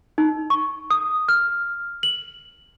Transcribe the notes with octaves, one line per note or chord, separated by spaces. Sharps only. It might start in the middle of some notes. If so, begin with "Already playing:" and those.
D#4
C#6
D#6
F6
F#7